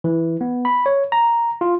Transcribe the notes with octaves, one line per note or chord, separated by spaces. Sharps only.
E3
B3
B5
C#5
A#5
F4